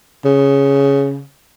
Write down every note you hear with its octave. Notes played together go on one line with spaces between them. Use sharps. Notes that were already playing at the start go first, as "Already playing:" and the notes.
C#3